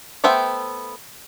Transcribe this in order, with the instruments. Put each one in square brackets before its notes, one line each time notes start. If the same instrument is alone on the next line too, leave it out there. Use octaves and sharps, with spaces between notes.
[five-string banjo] A3 B3 C5 E5 G5